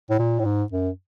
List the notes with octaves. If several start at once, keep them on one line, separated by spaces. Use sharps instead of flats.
A2
A#2
A2
G#2
F#2